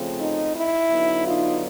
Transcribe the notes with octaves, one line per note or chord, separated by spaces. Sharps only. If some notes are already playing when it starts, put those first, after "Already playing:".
Already playing: C#3 F3 A3 C4
D#4
E4
D3 F#3 B3 D#4
D#4 F4